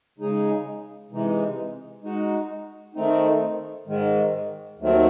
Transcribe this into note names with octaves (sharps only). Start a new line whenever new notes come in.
C#3 G#3 D#4 G#4
C3 E3 G#3 D#4
G#3 D#4 F#4
D#3 A3 C4 D#4
G#2 D#3 G#3
D#2 D#3 F#3 A3 C4